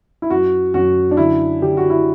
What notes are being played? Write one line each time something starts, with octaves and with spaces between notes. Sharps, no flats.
E4
F#2 F#4
F#2 F#4
D4
D3 E4
D3 G4
F#4
E4